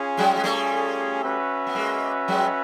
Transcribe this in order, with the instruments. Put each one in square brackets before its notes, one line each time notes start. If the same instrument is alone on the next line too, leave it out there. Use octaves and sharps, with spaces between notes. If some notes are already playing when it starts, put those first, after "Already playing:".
Already playing: [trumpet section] C#4 F4 G#4
[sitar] F#3 G#3
G#3
G3 A3
[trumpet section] C#4 F#4 B4 E5
[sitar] B3
G#3 A#3
F#3 G#3